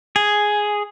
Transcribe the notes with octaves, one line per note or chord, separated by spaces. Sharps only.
G#4